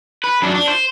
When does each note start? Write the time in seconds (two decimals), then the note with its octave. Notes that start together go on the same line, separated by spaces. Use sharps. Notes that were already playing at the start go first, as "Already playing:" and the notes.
0.24 B4
0.42 F#2 D4
0.54 D4
0.68 C5